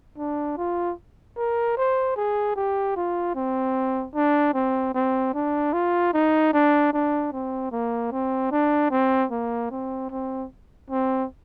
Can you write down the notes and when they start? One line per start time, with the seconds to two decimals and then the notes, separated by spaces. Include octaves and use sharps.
0.18 D4
0.57 F4
1.37 A#4
1.77 C5
2.17 G#4
2.56 G4
2.96 F4
3.35 C4
4.15 D4
4.54 C4
4.94 C4
5.34 D4
5.73 F4
6.13 D#4
6.53 D4
6.93 D4
7.32 C4
7.72 A#3
8.12 C4
8.51 D4
8.91 C4
9.31 A#3
9.71 C4
10.11 C4
10.90 C4